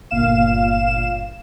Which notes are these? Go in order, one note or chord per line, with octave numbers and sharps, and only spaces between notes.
G1 A#2 F5 E7